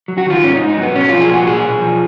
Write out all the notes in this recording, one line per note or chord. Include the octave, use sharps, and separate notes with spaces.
F#3
F#4
D#3 F4
G#2 C#4
D#4
G#2
D#4
F#3 B3
B1 C#4
F3 F4
G#4
A#2 F#4
B1 G#4
B1
F3